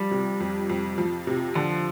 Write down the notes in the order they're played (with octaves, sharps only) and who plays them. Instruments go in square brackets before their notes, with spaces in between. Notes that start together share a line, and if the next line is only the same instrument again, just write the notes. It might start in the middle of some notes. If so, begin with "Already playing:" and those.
Already playing: [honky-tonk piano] F3 [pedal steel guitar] G3
[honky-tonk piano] C3
F2
F2
F3
C3
[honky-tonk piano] D3 [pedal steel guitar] F3